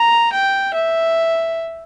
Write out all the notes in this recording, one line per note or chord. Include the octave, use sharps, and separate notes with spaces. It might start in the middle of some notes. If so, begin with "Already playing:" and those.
Already playing: A#5
G5
E5